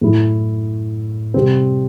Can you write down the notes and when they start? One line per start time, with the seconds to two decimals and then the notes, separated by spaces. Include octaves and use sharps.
0.01 A2 F#3 A3 E4
1.34 C3 G3 C4